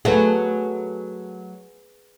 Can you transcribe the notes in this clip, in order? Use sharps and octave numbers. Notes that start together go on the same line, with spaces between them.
F#3 A3 G#4 B4